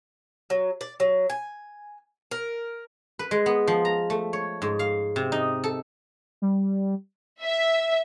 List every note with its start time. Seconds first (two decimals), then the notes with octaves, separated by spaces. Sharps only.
0.50 F#3
0.81 D5
1.00 F#3
1.30 G#5
2.31 A#4
3.19 B4
3.31 G#3
3.46 B3
3.67 F3
3.85 A#5
4.10 A3
4.33 C#5
4.62 G#2
4.79 F5
5.16 C3
5.32 D#4
5.64 A4
6.42 G3
7.42 E5